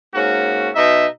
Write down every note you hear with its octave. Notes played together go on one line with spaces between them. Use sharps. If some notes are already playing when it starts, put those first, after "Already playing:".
G#2 A#3 C#4 F#4
B2 D#4 D#5 E5